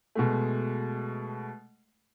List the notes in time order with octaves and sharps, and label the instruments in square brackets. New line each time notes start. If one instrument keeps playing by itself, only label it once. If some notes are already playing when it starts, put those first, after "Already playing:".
[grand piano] B2 G#3 A3